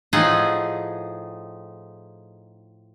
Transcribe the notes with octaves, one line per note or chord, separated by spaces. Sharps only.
A2 F3 D#4 G#4 F#5 G#5